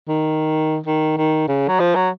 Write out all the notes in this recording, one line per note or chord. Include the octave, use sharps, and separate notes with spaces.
D#3
D#3
D#3
C#3
F#3
F3
F#3